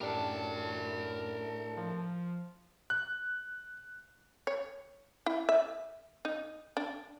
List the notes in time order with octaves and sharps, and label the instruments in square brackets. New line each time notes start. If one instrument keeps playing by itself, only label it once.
[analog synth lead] F#2 [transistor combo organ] A2 [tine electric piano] D4 G4 [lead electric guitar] A#4 A5
[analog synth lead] F3
[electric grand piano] F#6
[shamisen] C#5
E4
E5
D#4
D4